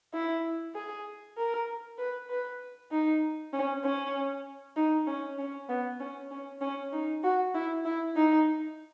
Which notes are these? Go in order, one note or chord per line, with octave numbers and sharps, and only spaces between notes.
E4
G#4
A#4
B4
B4
D#4
C#4
C#4
D#4
C#4
C#4
B3
C#4
C#4
C#4
D#4
F#4
E4
E4
D#4